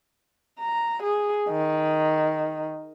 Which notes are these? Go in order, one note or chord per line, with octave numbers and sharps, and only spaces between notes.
A#5
G#4
D#3